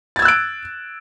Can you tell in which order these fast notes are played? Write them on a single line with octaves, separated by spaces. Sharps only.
A6 G#6 E6 F#6 D7